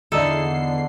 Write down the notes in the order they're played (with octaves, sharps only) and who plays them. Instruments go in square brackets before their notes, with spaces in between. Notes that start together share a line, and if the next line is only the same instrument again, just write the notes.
[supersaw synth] E2 C7 [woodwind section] D3 [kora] D#4 E4 [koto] A4